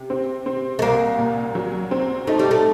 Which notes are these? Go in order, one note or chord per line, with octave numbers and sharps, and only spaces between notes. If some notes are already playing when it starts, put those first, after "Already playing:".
Already playing: C3
C4
C4
A3
C2 A#3
A#2
F#3
C4
A3 D#4
G3
A3